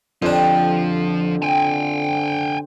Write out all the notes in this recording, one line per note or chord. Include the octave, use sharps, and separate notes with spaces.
F2 D3 F3 D4 G4 C5 G#5
C4 G5 G#5